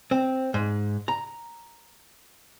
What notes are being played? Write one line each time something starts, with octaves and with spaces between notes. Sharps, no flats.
C4
G#2
A#5